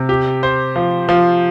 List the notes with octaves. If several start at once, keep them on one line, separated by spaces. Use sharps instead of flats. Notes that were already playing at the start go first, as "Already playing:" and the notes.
Already playing: C3
G4
C5
F3
F3